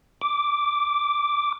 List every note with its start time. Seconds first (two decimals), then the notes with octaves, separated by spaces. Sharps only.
0.21 D6